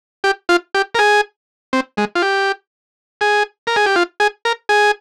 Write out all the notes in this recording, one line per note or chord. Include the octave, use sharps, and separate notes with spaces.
G4
F4
G4
A#4
G#4
C4
G#3
F4
G4
G#4
A#4
G#4
G4
F4
G#4
A#4
G#4